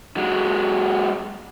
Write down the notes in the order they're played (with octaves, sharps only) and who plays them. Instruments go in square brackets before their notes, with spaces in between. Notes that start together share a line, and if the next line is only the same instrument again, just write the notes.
[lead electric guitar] F#3 G#3